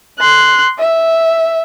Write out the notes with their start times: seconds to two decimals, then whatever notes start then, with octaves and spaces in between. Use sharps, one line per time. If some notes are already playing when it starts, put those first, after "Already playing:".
0.19 C6 F#6
0.80 E5